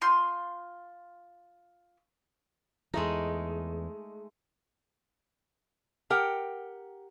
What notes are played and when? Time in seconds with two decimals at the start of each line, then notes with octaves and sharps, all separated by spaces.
0.01 F4 C6 G6
2.94 E2 E3 G#3 A3 D#4
6.10 G4 A#4 F#5 G5